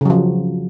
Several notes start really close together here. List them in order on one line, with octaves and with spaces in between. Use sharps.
C#3 F#3 F3